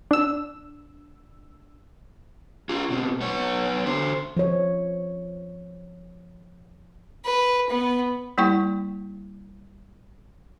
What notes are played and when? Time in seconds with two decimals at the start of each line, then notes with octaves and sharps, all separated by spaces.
0.11 D4 E6
2.69 F4 G#4
2.90 B2 C4
3.21 B3 C#5
3.86 D3 C5
4.37 F3 C#5
7.25 B4
7.70 B3
8.38 G3 A#3 E4 G5 C#6